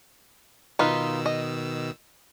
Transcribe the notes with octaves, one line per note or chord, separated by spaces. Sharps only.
B2 D#3 D#4 F4 B4 E6
D#5